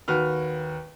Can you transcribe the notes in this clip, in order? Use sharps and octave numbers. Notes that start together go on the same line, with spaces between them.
D#2 F#4 B4 F6